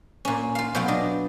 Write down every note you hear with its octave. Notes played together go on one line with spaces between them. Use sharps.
A#2 C#4
F4 F5
B2 F#3 B3 F4 G5
D4 D#5